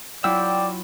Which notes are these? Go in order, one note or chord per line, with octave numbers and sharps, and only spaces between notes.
F#3 E4 F4 D5 G5 E6